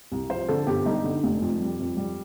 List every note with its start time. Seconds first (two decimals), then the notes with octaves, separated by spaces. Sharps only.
0.12 C2
0.30 F3 C5
0.48 D3 A4
0.67 G1 G4
0.86 G3 D#4
1.04 D3
1.23 F1
1.42 F2
1.61 G3
1.79 F2
1.97 G3